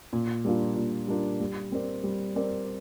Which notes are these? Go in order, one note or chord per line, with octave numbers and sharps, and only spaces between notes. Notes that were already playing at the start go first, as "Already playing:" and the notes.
A#2
G3 A#3 D4 F4
A#2
G3 A#3 D4 F4
G3
C4 A#4 D5
G3
C4 A#4 D5